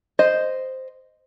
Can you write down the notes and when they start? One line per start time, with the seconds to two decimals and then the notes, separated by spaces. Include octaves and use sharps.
0.19 C5 D#5